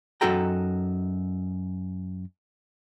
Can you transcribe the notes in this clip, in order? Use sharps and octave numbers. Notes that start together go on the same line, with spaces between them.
F#2 D#4 F#4 A4 G5 A#5